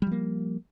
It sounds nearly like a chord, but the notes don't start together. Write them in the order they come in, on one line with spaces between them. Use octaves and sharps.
G3 F3 A#3